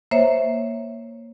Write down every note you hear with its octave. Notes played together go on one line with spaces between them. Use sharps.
A#3 C5 C#5 E5